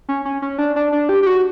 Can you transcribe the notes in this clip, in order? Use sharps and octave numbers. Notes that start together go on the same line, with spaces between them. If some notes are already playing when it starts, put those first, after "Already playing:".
C#4
C#4
C#4
D4
D4
D4
G4
G4
F#4